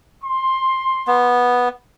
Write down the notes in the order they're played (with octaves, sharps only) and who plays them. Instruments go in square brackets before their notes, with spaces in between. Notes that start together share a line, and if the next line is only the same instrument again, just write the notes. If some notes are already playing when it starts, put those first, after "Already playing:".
[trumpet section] C6
[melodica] B3